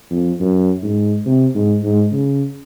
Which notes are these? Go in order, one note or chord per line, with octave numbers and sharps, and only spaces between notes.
F2
F#2
G#2
C3
G#2
G#2
C#3